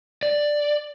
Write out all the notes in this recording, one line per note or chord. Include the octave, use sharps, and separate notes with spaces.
D5